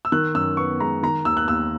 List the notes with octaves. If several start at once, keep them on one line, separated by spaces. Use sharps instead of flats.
E6
D#3 F#6
F#2 E6
B3 C#6
G#3 A#5
D#3 A#5
D#2 E6
F#6
D#2 E6